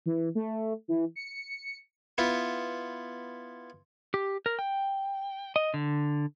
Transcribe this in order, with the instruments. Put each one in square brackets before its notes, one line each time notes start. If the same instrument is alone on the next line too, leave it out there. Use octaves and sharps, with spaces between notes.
[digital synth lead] E3
A3
E3
C#7
[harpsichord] B3 E4 F4
[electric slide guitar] G4
A#4
G5
D#5
D3